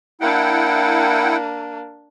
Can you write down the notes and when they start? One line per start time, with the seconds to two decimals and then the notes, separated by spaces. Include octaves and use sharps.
0.21 A#3 D4 E4 F#5 G5